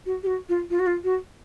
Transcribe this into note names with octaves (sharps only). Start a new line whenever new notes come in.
F#4
G4
F#4
F4
F4
F#4
F4
F#4